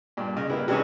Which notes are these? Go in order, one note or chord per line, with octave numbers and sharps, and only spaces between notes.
G2 A#2
C#3 D#5
G3 A#3 B3 E4
C3 E3 G3 C#4 D#4 G#4